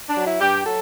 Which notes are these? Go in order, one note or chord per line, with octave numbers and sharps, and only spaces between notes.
D4
F#3
E4
G2 G4
F#3 A4